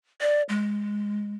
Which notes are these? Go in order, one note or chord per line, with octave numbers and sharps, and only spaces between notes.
D5
G#3